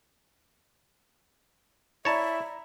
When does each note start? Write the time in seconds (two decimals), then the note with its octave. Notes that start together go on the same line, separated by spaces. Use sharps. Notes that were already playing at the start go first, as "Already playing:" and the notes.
2.05 E4 C#5 D5 E5 A5 A#5